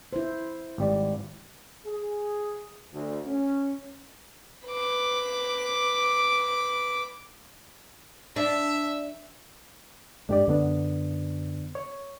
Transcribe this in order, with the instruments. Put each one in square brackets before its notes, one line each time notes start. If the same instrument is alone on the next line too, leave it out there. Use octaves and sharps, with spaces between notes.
[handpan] E4 C5
[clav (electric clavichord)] G#1 G3 D5
[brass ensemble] G#4
D2
C#4
[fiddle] B4 D6
[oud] D4 [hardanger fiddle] E5
[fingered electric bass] G2 G#3 [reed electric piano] D4 G4 D5
[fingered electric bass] F#2 [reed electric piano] D3 B3 D4
[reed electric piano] C#5